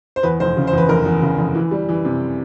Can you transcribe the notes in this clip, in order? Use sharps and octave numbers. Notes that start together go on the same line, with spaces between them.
C5
E2 B4
F1 C5
C#3
C5
E2 B4
F1 A#4
E2
C#3
F1
E3
G3
E3
C3